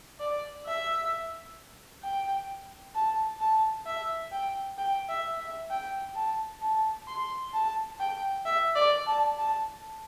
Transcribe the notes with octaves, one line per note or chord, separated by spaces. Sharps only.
D5
E5
G5
A5
A5
E5
G5
G5
E5
E5
G5
A5
A5
C6
A5
G5
E5
D5
A5
A5